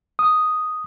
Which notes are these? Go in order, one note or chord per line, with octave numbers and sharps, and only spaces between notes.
D#6